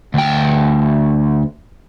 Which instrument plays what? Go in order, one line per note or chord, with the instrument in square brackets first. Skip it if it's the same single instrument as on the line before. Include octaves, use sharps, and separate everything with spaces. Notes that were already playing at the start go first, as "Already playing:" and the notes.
[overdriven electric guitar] D2 G5